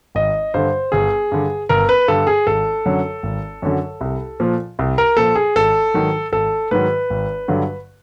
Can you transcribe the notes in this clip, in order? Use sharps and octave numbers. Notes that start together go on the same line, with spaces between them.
G#1 D#5
G2 D3 C5
G1 G#4
G2 D3
G1 A#4
B4
G2 D3 A4
G#4
G#1 A4
F#2 D3 F#3
G#1
F#2 D3 F#3
C2
A#2 F3
C2
A#4
A#2 F3 A4
G#4
G#1 A4
G#2 D#3 F#3
G#1 A4
G#2 D#3 F#3 B4
G#1
G2 D3 F#3